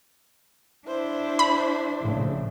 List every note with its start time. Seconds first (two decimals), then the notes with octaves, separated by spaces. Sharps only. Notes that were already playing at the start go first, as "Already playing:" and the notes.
0.87 D4 E4 C5
1.39 B5
2.01 A#1 A2 C#3